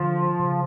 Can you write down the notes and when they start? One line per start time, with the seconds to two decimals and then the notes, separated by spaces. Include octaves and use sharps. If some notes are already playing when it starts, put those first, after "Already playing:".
Already playing: D3 F3
0.40 C#3